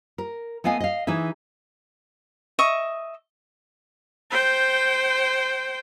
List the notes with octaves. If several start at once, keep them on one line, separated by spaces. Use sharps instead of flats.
A#4
A3 B3 D#5 F5 G#5
D#5 F5
E3 D#4 G#4 E5
D#5 E5 C#6
C5 G5